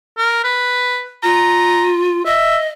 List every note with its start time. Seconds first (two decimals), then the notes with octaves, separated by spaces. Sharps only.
0.17 A#4
0.44 B4
1.23 F4 A#5
2.26 D#5 E5